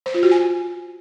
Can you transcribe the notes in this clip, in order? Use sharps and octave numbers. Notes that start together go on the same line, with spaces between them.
C5
F4
F#4
G#5